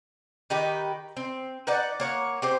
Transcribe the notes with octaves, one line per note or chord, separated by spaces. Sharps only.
D#3 D#4 G4 B4
C4
D#4 B4 D5 F#5
A#3 C#5 F#5
C4 G4 C5